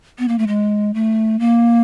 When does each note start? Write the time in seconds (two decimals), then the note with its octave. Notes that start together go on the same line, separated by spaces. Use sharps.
0.19 B3
0.28 A#3
0.39 A3
0.47 G#3
0.94 A3
1.39 A#3